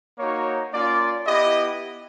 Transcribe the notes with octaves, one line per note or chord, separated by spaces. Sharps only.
A#3 D#4 F#4 C#5
A#3 C#4 F4 D5
B3 E4 G4 D#5